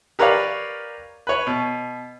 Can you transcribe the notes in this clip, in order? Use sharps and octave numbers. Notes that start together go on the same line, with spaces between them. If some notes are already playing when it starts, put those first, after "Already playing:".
G4 A#4 B4 C#5 D5 F5
B4 C#5
B2